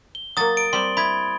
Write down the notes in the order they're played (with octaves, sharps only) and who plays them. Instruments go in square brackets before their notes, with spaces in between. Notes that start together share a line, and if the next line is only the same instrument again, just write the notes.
[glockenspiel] G7
[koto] F#3 A#3 [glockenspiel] D#6 A6
[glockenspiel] D7
[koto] G3 C4 D5 [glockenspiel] C6 G7
[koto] E4 [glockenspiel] B5 G#6